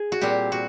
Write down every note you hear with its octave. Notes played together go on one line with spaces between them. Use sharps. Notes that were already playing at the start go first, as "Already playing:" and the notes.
Already playing: G#4
F#4
A#2 G3 C4 G4
F#4